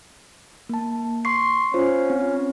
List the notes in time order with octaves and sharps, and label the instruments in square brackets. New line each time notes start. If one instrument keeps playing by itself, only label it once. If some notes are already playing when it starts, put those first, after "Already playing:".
[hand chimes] A#3 A5
C6 C#6 C7
[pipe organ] C#4 [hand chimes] F4 C5
[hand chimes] C4